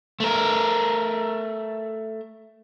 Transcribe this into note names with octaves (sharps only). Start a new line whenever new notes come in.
A3 A#4